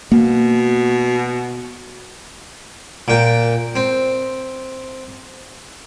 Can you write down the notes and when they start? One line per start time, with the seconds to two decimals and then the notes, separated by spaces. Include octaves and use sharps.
0.12 B2 A#3
3.08 A#2 G5
3.75 C4